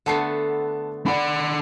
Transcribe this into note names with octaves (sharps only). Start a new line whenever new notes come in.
D3 A3 B3 F#5 A5 C7
D4 D5 F#5 B5